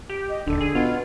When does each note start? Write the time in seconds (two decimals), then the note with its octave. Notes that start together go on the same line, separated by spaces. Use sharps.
0.09 G4
0.29 D#5
0.47 D#1 D3 A4
0.61 G#4
0.75 B2 F4 F#5